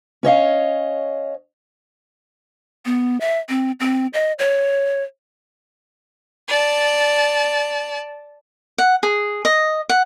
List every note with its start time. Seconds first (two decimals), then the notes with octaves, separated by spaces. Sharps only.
0.23 C#4 C#5 D#5 F5
2.86 B3
3.21 E5
3.49 C4
3.80 C4
4.13 D#5
4.39 C#5
6.48 D5 A5
8.78 F#5
9.03 G#4
9.45 D#5
9.89 F#5